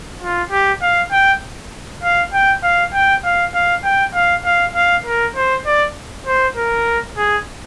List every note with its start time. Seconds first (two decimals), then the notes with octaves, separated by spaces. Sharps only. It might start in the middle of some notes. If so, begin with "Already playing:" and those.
0.22 F4
0.51 G4
0.82 F5
1.12 G5
2.03 F5
2.33 G5
2.63 F5
2.94 G5
3.24 F5
3.54 F5
3.84 G5
4.15 F5
4.45 F5
4.75 F5
5.06 A#4
5.36 C5
5.66 D5
6.26 C5
6.56 A#4
7.17 G#4